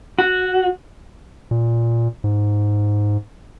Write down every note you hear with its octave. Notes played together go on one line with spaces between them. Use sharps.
F#4
A#2
G#2